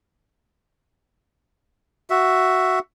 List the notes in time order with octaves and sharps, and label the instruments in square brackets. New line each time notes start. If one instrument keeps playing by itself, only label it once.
[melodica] F#4 E5